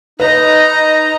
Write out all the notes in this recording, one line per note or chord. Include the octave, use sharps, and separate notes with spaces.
D#4 B4 D#5 A#5